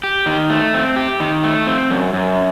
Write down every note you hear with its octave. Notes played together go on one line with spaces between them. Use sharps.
G4
D#3
A3
C4
G4
D#3
A3
C4
F#2
F#2